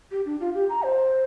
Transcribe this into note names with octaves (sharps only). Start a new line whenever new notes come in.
G4
D4
F4
G4
A#5
C5